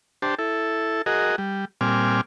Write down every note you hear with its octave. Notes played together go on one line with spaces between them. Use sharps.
D4 G4 C5 A5
E4 A4
F#4 G#4 A#4 D#5
G3
A#2 G3 C4 G#5 D6 F6